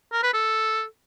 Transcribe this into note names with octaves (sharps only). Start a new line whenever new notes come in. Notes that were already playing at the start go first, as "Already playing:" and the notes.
A#4
B4
A4